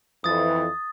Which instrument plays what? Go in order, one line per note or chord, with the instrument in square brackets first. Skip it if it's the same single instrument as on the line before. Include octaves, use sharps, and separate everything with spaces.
[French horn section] F2 E3 [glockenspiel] D#6 A6